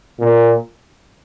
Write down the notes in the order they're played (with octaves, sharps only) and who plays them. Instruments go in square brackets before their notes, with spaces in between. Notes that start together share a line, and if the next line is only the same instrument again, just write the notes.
[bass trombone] A#2